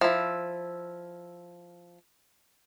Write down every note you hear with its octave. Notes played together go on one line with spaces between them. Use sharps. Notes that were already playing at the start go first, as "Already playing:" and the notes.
F3 E4